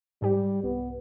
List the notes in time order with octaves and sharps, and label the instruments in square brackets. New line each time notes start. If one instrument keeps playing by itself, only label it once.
[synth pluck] G#2 G4 [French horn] G3
[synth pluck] C2 [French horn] B3